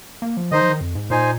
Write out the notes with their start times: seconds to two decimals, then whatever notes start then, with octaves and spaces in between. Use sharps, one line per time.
0.22 A#3
0.37 F3
0.52 D#3 D#4 C5 D#5
0.61 F3
0.69 D#3
0.81 F2
0.95 G#2
1.10 A#2 D#4 C5 G#5